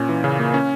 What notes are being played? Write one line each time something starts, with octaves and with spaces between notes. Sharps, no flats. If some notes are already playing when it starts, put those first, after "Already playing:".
Already playing: A#2 C#4
E3
C#3
A#3
C#4